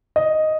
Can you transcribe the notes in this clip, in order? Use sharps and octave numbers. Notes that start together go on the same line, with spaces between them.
D#5